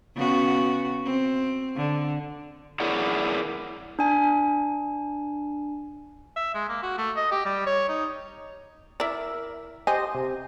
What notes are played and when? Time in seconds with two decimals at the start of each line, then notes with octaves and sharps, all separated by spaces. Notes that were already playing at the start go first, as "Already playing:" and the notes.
0.15 C#3 B3 F#4
1.05 C4
1.77 D3
2.80 E4 G#4 A#4 C#5 D5 F#5
3.99 D4 G#5
6.36 E5
6.54 G#3
6.69 A#3
6.82 F#4
6.98 A3
7.16 D#5
7.32 G4
7.45 G3
7.66 C#5
7.89 D#4
9.00 E4 A#4 D5 E5
9.87 G4 C5 D#5 G#5
10.15 C3